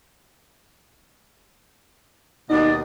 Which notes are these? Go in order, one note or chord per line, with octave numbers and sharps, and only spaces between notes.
D#2 B2 D#4 D5 D#5